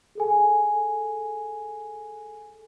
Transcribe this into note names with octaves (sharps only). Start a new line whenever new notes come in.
G#4 A4 G#5